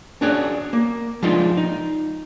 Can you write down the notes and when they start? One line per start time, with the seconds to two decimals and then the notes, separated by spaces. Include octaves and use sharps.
0.21 C#4 D4 F#4 G#4 C#5 D5
0.73 A#3
1.22 F3 G#3 D4 D#4 F4
1.57 D#4